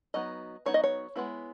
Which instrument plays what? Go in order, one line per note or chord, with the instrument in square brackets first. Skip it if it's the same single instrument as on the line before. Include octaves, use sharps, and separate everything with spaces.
[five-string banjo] F#3 B3 D#4 D#5
F#3 B3 D#4 C#5
D#5
C#5
G#3 B3 E4